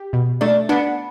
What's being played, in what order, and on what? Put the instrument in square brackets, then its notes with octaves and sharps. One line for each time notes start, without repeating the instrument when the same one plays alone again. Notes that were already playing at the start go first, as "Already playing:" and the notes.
Already playing: [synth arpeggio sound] G4
B2
[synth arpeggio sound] A3 [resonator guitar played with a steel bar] D4
[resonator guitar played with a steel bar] B3 [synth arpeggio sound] D4